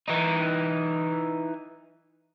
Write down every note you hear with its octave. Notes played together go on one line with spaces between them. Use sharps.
E3 D#4